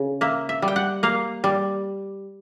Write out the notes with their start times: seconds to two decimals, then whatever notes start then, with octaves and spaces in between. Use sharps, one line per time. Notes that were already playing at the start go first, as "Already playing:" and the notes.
Already playing: C#3
0.21 A#3 E5
0.49 E5
0.62 G3
0.68 G5
0.76 F#5
1.03 A#3 F5
1.44 G3